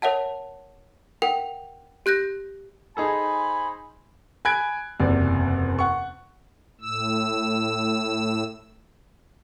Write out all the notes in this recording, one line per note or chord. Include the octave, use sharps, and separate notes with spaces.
A#4 C#5 E5 F#5 A5
A#4 F#5 G5
G4 F#6 G6 A#6
D#4 G#4 A4 C5 G#5 B5
G#5 B5 F#6 G#6 D7
F#1 E2 C3 D5
F#5 C#6
A2 E6